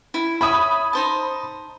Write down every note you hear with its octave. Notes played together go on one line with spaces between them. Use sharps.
E4
C#5 E5 B5 D#6
D#4 C5 A5